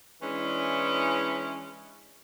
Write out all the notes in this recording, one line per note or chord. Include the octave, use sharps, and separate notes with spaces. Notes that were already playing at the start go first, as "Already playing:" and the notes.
E3 G#3 C#4 D4 E4